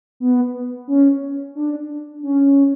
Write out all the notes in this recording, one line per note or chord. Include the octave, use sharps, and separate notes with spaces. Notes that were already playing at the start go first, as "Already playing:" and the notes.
B3
C#4
D4
C#4